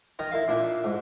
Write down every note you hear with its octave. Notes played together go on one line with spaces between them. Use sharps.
D#3 A#4 D#5 A#5
E4 A#4 E5 F5
A#2 D4 E4 E5
G#2